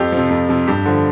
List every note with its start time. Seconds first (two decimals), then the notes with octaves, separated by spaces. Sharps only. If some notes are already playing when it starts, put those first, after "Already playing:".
Already playing: F2 G4
0.12 C3 F3
0.30 F2
0.49 C3 F3
0.68 G2 G4
0.86 D3 F3